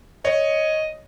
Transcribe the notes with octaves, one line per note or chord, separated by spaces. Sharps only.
C#5 D#5